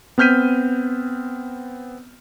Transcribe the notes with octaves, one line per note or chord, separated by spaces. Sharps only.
B3 C4 F6 G6 B6 D#7